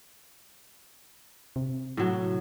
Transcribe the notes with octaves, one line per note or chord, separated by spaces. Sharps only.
C3
A2 F#3